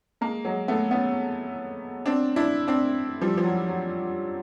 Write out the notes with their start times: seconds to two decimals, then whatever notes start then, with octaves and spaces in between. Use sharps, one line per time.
0.21 G#3 A#3
0.45 F#3 G#3
0.68 A3 B3
0.91 B3 C#4
2.06 C4 D4
2.36 D4 E4
2.68 C4 D4
3.21 F3 G3
3.37 F3
3.44 F#3
3.68 F#3